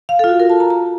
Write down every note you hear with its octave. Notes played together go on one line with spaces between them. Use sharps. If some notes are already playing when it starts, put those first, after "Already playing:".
F5
A4
F4
F#4
A#4
A5
A#5
A#5